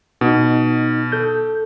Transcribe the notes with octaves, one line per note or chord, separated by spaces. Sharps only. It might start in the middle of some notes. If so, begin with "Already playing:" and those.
B2 D#4
A4 G6